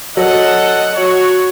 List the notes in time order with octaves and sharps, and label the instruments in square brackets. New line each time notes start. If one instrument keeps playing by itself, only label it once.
[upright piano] F#3 [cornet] A4 [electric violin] D#5 F#5
[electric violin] F#4 [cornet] C#5